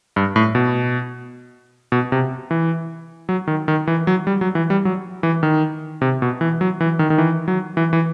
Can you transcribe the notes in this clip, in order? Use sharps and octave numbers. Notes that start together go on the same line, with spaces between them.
G2
A2
B2
B2
C3
E3
F#3
D#3
D#3
E3
F#3
G3
F#3
E3
G3
F#3
E3
D#3
C3
B2
E3
F#3
E3
D#3
D#3
E3
F#3
E3
E3